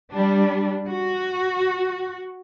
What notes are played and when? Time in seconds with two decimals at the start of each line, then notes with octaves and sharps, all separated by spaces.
0.10 G3 D4
0.89 F#4